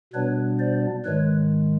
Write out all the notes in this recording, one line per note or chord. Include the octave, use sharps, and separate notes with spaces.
B2 G3 B3 D4 B4 C#5
C5 D5
G#2 D#3 G#3 B4 C#5